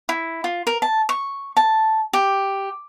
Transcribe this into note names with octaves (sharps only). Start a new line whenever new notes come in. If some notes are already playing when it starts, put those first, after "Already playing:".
E4
F4
A#4
A5
C#6
A5
G4